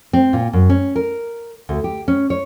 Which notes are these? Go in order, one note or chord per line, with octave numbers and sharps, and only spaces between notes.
C4
A#2
F#2
C#4
A#4
D2
G4
C#4
C#5